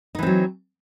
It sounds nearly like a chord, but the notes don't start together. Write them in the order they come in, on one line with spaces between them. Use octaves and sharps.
D#4 E3 C4 F#3